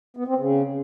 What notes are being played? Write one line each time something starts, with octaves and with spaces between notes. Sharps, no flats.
B3
C4
C#3